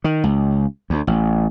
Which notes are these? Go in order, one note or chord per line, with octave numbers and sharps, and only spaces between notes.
D#3
C#2
D2
A1